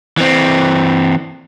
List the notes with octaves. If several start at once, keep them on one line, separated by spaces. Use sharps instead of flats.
E3 C4